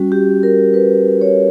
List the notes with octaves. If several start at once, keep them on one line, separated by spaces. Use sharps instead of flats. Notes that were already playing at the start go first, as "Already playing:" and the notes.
Already playing: G3 C#4 F#4
G4
A#4
B4
C#5